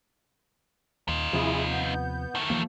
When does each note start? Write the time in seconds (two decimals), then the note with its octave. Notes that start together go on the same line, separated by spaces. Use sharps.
1.09 D#2 D#4 F4
1.33 D#2 C3 F3 E4 G#4
1.71 B3 G6
2.35 D#3 A3
2.50 E3 F3 A#3